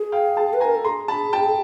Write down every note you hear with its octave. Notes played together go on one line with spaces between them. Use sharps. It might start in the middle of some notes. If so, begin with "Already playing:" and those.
Already playing: G#4
F5 G5
G5 A5
B4
G#5 A#5
A#4
A4
G#4 A#5 C6
A5 B5
G5 A5